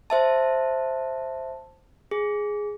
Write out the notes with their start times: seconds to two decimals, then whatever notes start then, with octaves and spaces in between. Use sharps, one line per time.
0.10 C5 E5 A5
2.11 G#4